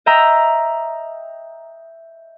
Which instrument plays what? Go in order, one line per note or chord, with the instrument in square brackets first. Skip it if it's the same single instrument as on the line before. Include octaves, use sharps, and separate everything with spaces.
[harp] D#5 E5 G5 A#5